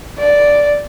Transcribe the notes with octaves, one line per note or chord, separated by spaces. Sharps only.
D5